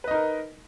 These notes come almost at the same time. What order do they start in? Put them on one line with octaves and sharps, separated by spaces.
B4 D#5 D#4 A#4